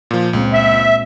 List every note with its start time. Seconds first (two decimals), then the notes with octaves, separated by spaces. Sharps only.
0.11 A#2 F3
0.33 C#2 A#2 G#3 C4
0.53 E5